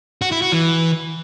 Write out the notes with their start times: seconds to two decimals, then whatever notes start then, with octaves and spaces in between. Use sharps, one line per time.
0.22 F#4
0.32 E4
0.42 F#4
0.52 E3